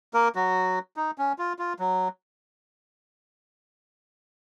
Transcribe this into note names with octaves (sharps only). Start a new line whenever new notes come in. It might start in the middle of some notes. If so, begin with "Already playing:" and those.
A#3 A#4
F#3 F#4
D#4
C#4
F4
F4
F#3